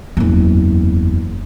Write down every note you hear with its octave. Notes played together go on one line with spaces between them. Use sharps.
F#1 E2